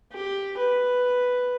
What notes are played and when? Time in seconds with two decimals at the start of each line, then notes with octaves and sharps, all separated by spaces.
0.13 G4
0.58 B4